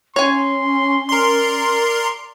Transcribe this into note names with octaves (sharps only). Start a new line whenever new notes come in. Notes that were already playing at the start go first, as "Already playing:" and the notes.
C#4 C#5 G#5 C6
A#4 D5 C6